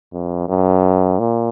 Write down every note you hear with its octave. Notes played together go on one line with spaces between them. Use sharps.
F2
F#2
A#2